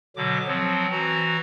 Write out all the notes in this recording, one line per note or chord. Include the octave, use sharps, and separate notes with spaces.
B2 D3 F#3 D6
F3 F#3 C4
E3 F#4 A#5